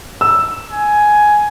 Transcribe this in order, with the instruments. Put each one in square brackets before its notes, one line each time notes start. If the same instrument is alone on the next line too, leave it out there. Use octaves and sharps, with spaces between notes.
[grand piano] E6
[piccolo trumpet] G#5